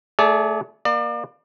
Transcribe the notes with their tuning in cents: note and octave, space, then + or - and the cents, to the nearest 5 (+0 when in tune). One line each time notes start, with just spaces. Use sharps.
A3 +0 G#4 +30 D5 -15
A#3 +15 D5 +35